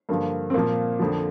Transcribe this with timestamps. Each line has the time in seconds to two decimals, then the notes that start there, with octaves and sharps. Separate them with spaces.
0.09 G2 D3 F3 A#3
0.50 C4
0.54 A#2 F3 A#3
1.00 F2 D3 F3